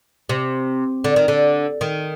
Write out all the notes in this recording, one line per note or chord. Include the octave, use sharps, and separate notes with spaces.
C3
D3
D#3
D3
D#3